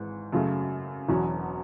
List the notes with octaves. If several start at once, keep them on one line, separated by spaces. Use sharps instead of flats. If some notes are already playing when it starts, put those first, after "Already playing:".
Already playing: G#1 G#2 E3
F#2 C#3 F#3 A3
E1 E2 B2 F#3 C#4